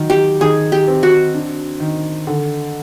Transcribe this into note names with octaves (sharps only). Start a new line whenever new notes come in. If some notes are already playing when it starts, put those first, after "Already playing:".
Already playing: D#3 F#3
G4
D#3 G#4
G4
C4
F#4
D4
D#3
D3